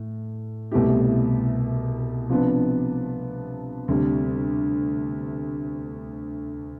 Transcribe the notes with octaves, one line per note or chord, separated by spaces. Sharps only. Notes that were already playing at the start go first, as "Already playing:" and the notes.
Already playing: A2
C2 B2 A3 E4 G4
C3 F3 B3 D4
D2 C3 G3 D4